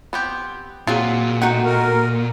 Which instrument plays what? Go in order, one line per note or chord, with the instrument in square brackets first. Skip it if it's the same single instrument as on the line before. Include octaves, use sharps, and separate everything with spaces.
[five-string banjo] B3 C4 G4
[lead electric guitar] A#2 [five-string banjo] F#3 F4 [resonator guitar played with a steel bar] C4 F#4 G#4
[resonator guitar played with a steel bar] A3 D#4 F#4 [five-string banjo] F#5 G5
[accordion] A#4